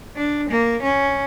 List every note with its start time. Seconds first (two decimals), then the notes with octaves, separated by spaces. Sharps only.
0.17 D4
0.50 A#3
0.83 C#4